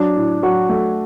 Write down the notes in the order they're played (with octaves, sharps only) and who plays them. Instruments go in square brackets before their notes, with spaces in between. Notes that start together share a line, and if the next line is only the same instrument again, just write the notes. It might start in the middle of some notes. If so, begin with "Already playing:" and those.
Already playing: [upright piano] F#3 [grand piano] D4
[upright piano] A2
[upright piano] F#3 [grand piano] F#4
[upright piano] A3